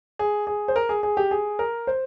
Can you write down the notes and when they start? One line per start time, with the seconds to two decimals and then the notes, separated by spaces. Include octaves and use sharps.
0.19 G#4
0.47 G#4
0.68 C5
0.76 A#4
0.89 G#4
1.03 G#4
1.17 G4
1.31 G#4
1.59 A#4
1.87 C5